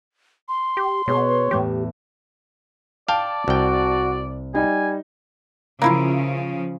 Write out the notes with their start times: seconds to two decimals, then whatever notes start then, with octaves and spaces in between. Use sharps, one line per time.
0.49 C6
0.77 G4
1.08 B2 B3 G#4 C#5
1.51 E2 A2 G4
3.09 D5 F5 G5 A5
3.48 C2 F#4 G5
4.55 G3 D#4 G#5
5.82 C#3 F3 A#3 E4 F4